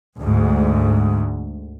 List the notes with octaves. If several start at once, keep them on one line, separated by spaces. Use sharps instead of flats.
D2 G#2